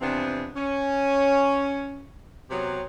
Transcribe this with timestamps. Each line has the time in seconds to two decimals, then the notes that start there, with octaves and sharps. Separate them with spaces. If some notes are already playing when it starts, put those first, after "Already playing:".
0.01 F2 C3 E3 B3 C4 D4
0.56 C#4
2.50 C3 F#3 B3 C4 G4 C#5